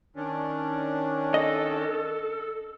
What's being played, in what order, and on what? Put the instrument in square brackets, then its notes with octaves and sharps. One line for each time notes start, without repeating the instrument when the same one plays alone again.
[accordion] D#3 C#4 D4
[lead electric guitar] A4 [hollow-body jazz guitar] D#5